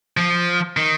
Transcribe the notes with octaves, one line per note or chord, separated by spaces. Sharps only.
F3
D#3